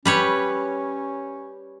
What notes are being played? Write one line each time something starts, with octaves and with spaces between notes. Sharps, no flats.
G3 C#4 B4 C#5